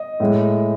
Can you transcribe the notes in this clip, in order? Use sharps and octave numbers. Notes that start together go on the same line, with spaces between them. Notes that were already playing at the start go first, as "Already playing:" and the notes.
Already playing: D#5
A2 G#3